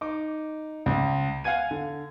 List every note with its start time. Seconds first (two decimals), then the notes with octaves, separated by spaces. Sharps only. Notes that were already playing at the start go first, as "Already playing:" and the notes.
0.01 D#4 D6
0.86 C#2
1.44 F5 F#5 G#5 G#6 D#7
1.71 D3